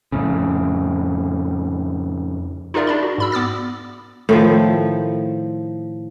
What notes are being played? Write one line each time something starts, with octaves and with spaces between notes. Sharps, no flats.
F2 A2 C#3
D#4 F4 G#4 A#4 D5 E5
D4 D5 B5
F#4
G#2 B5 E6
B3 D6 E6 A6
A2 D#3 F3